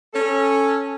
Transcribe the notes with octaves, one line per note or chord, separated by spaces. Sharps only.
C#4 A4